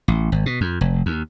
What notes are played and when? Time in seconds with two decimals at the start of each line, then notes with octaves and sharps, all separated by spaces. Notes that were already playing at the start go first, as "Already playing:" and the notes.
0.08 A1
0.32 G#1
0.46 B2
0.61 F2
0.81 F1
1.06 D#2